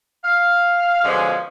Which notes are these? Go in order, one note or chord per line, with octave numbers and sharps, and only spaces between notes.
F5
B2 D3 F3 G#3 C#4